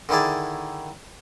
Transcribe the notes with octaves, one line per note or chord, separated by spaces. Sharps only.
D3 D#3 E4 G#4 D5